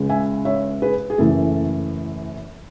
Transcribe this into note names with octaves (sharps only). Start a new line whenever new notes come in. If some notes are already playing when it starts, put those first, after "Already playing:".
Already playing: C#2 C#3 G#3
E5 G#5
C#5 E5
G#4 B4
G#4
F#1 F#2 E3 A3 A4